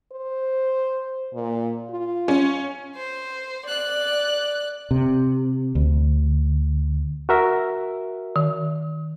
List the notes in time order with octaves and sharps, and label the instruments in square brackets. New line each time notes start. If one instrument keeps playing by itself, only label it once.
[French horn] C5
A#2
F4
[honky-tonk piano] C#4
[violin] C5
D5 F#6
[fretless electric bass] C3
D2
[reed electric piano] F#4 A#4 E5
[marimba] D#3